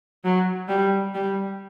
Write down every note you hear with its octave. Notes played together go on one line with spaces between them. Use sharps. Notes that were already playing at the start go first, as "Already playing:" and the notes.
F#3
G3
G3